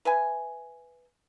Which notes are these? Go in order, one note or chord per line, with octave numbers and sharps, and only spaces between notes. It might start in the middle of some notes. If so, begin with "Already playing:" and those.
B4 E5 G#5